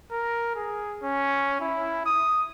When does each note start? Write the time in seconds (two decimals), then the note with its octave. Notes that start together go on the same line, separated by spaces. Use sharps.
0.11 A#4
0.55 G#4
1.03 C#4
1.60 E4
2.06 D#6